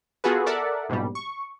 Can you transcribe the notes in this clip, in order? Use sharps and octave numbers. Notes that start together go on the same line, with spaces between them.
B3 F4 F#4 G#4 A4 B4
A4 A#4 D5 E5 F#5
A#1 G#2 B2 G3
C#6